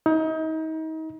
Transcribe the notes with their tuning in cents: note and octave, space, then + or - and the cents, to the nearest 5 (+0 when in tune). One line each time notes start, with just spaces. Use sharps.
D#4 +35